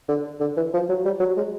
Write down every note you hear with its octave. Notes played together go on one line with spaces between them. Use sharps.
D3
D3
E3
F3
F#3
G3
F#3
G#3